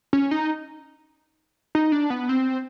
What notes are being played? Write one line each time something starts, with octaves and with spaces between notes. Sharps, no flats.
C#4
D#4
D#4
D4
B3
C4